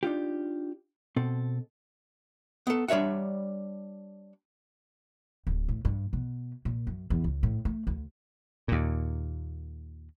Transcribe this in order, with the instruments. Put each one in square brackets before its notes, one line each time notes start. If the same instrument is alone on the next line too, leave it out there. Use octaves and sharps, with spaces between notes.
[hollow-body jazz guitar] D4 D#4 F4 G4
B2 C4 A4
B3 A4
G3 D4 C#5 E5 F#5
[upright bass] D1
A2
G2
B2
A#2
F#2
E2
C#2
A2
A3
D2
[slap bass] D#2 A#2